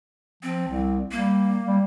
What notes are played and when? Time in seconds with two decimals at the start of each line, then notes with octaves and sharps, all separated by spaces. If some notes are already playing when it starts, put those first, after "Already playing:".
0.43 F3 C4
0.68 C2
1.11 G3 A#3
1.65 G3